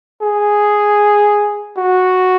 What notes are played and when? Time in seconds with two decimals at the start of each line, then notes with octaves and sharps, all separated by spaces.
0.22 G#4
1.77 F#4